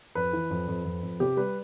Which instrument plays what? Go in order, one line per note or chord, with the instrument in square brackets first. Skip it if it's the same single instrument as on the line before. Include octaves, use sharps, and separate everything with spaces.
[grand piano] F2 B4
E3
F2
F2
F2
F2
C3 G4
G3 B4